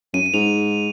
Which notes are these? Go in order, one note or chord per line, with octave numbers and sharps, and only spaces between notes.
F#2 D#7
D#7
G#2 F7